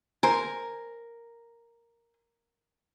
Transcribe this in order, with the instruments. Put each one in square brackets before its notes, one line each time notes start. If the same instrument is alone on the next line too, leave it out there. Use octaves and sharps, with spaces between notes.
[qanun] A#4 [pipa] C5 G#5